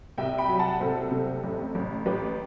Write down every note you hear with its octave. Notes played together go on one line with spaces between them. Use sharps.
C2 E5 G5
G5 B5
F#3
F#5 A5
C2 A4 C5
C3
A1
A1
A1 G4 B4